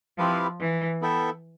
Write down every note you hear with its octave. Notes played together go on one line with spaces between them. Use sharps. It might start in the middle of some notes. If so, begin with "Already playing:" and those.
F3 C4 E4 G4 B4 F5
E3
B3 E4 A4 E5 G5